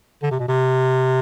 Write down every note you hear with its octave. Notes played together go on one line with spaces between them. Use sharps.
D3
C3
B2
C3